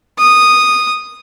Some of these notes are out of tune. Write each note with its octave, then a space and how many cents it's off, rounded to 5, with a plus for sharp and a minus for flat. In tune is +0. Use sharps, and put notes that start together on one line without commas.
D#6 -10